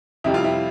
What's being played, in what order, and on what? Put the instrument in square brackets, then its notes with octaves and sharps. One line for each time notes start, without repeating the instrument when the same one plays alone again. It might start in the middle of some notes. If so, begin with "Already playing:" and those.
[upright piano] F2 C3 G3 E4
F4
E4